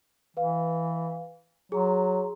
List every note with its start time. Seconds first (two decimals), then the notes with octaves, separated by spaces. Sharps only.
0.37 E3 B4 F5
1.72 F#3 G#4 A#5 C6